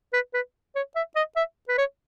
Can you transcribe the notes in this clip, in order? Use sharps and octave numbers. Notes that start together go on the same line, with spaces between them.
B4
B4
C#5
E5
D#5
E5
B4
C#5